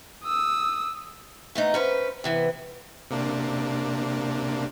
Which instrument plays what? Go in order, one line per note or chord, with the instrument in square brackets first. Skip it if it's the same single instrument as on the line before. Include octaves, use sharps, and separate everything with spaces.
[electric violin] D#6 E6
[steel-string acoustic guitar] A3 B3 D#4
C#4 B4 C5
C3 E3 B3
[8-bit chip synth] C3 A#3 D4